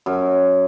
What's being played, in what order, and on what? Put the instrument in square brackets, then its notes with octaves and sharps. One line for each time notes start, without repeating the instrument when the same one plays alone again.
[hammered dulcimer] F#2